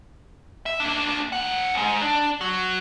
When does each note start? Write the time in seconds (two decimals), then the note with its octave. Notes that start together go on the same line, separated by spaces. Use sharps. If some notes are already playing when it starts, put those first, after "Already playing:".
0.66 E5
0.80 A#3 D4
1.32 D#3 F#5
1.74 E2 G#2
2.02 D4
2.41 F#3